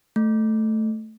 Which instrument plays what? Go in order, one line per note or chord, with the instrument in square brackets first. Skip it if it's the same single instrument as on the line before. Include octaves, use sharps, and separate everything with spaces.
[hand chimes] A3